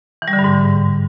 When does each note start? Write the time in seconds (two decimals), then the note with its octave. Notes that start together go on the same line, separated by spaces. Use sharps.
0.22 E3
0.28 G3
0.33 D3
0.39 G2
0.44 G#2